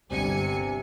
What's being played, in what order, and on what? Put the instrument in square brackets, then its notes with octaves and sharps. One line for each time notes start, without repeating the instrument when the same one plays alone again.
[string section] G1 G#5 C#7 [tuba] C3